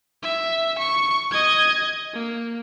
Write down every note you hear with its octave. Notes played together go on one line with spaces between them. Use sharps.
E5
C#6
D#5 G#6
A#3